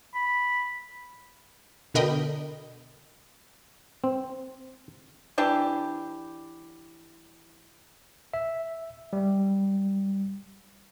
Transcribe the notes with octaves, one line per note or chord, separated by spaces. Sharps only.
B5
B2 D3 A#4 D#5 G5 B5
C4
E3 D4 G4
E5
G3